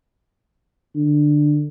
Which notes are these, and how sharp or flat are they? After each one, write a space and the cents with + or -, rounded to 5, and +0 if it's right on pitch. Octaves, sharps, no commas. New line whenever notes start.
D3 +15